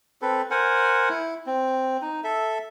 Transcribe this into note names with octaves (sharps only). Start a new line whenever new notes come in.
C4 A4 B4
A#4 C5 F#5 G#5
E4
C4
D#4
A4 E5